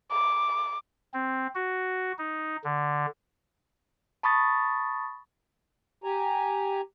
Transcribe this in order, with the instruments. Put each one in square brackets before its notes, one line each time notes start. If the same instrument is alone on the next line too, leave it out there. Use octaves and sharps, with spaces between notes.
[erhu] D6
[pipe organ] C4
F#4
D#4
D3
[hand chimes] A5 B5 C#6 D#6 A6
[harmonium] G4 G#5 A#5